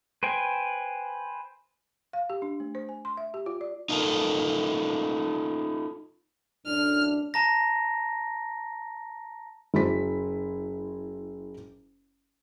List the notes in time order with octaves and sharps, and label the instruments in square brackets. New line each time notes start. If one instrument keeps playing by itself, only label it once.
[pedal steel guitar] B4 C5 G5 G#5
[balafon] F5
G4
D4
A3
C5
G#5
C6
E5
G4
F4
D5
[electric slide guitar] D#4 F4 A4 A#4
[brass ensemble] F#2 A2 D4 [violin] F6
[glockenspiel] A5 A#5 A#6
[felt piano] F#1 E4 F#4 C5 B6